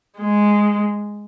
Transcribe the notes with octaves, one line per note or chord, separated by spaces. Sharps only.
G#3